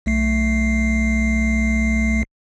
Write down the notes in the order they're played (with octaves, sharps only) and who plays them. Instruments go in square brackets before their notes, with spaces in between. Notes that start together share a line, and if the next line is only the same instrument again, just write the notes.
[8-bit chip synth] B1 A3 C7